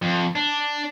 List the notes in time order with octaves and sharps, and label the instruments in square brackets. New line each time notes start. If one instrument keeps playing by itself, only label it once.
[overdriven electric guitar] F2
D4